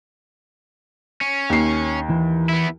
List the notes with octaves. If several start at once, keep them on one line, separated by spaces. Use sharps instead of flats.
C#4
D#2 C7
E3
B3 E4